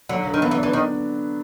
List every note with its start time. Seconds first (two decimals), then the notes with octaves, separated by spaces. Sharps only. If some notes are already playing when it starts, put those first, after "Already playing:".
0.09 D3 F#3
0.26 D3
0.34 D#3
0.41 E3 B3
0.51 E3
0.58 D4
0.63 E3
0.72 D#3 D4